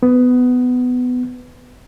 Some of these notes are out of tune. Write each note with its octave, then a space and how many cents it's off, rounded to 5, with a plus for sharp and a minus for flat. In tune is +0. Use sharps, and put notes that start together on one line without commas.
B3 +15